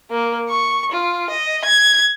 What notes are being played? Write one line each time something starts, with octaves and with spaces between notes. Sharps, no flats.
A#3
C#6
F4
D#5
G#6